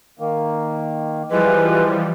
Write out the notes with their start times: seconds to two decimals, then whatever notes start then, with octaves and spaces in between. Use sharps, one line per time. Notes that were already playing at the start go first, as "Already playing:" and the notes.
0.19 D#3 A#3
1.30 E3 F3 G3 G#3 B4